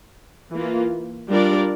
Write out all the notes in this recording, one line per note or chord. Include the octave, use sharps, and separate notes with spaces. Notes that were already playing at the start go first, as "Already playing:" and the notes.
E3 A#3 F4
G3 D4 F4 A#4 D5